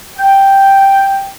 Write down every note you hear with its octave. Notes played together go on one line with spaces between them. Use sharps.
G5